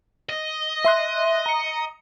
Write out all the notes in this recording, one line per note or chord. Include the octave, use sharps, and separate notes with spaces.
D#5
E5 C6 F#6
A#5 C#7